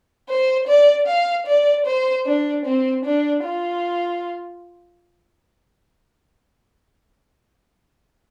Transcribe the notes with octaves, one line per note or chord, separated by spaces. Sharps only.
C5
D5
F5
D5
C5
D4
C4
D4
F4